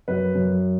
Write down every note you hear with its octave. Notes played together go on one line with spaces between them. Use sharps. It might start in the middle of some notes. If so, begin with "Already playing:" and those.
F#2 B4
F#2